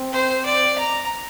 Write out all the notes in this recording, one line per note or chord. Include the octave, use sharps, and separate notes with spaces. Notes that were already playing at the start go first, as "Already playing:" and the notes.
Already playing: C4
C5
D5
A#5